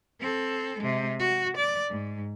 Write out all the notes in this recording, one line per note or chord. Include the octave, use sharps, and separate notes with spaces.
C4 A4
C3 G#3
F#4
D5
G#2